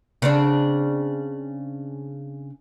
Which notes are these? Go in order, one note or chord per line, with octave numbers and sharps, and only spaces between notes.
C#3 C4 D4